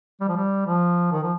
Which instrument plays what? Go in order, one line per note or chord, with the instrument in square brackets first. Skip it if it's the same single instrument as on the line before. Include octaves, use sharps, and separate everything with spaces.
[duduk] G3
F3
G3
F3
D#3
F3